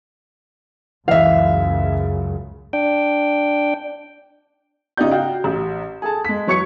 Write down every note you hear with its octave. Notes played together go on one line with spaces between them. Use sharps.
C#2 F#2 C#3 E3 E5 F5
D4 G5
C#3 D#4 F4 G4 D5 G6
F#4 F5 G5
A1
G#4 A4 A5
G#3 B6
E3 F#3 C#5 C#6 G#6 C#7